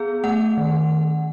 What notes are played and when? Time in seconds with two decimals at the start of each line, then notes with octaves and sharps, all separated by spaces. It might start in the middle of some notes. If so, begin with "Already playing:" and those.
Already playing: B3 G#4
0.24 A3 F#5
0.58 D#3